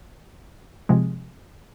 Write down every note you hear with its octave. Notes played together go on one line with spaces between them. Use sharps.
C3 F3 G#3